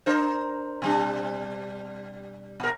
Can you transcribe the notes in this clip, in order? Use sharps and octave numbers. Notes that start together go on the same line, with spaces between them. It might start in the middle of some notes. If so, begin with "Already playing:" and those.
D4 A#4 C5
B2 G3 D4
A#2 A#4